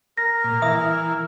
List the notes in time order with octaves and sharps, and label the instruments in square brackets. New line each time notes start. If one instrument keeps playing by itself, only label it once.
[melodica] A#4 [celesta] A#6
[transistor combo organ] A#2
[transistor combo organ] E3 [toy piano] E5 D#6